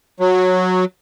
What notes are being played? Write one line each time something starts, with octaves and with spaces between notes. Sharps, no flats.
F#3